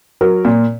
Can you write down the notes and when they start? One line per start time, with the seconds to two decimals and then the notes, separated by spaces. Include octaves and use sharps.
0.21 F#3 A#4
0.45 A#2